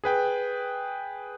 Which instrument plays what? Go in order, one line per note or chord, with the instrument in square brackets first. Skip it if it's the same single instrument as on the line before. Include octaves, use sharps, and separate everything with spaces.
[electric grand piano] G#4 B4 G5